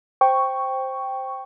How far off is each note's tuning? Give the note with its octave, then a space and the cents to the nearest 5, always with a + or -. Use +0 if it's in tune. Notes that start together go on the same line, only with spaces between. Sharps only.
C5 +0 G5 +0 C#6 +0